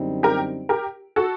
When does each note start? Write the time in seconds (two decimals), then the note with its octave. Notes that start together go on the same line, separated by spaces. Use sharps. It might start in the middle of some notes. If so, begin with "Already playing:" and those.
Already playing: F#2 D3 G3 C4 D#4
0.23 G4 A#4
0.69 G4 A#4
1.16 F#4 A4